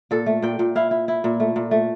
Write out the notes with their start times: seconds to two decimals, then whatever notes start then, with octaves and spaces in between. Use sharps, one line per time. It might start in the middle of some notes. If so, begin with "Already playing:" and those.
0.11 A#2 A4
0.26 A3
0.42 A#2 G5
0.59 A#2
0.75 E4 F5
0.91 E4
1.08 E4
1.24 A#2
1.40 A3
1.56 A#2
1.71 A3